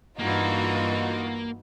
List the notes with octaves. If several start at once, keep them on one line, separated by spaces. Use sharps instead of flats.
G2 E3 A#3 D#4 F4 F#4